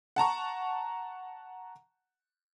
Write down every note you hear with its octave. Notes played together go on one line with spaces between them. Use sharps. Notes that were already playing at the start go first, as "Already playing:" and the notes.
F#5 A5 A#5 C#6